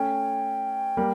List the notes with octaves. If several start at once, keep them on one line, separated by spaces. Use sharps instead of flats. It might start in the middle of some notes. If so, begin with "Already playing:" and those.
Already playing: A3 C#4 G5
G3 A#3